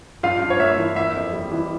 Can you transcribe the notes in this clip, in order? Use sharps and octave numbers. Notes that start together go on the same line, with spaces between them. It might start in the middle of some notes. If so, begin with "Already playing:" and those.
G2 F4 F5
G2
C#5
A#3 E5
E3
A#3 E5
F2
G3
E3